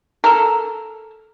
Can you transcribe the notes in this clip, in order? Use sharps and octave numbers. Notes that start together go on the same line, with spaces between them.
A4 A#4